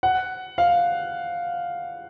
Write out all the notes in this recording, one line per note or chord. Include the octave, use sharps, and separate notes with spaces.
F#5
F5